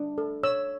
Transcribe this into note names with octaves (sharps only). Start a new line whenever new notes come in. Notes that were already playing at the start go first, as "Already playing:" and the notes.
Already playing: D4
A4
C#5 E6